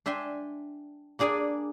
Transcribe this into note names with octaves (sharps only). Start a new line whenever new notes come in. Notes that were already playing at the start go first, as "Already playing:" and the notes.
D4 E5 G5 G#5 C6
A#3 D4 G#4 D5 G#5